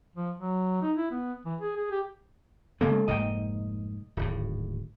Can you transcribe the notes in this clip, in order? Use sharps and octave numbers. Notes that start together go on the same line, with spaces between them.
F3
F#3
D#4
E4
B3
E3
G#4
G#4
G4
C#3 G#3 A#3 B3 A4
F1 G#2 A#3 D#5 G5
D1 G#1 A2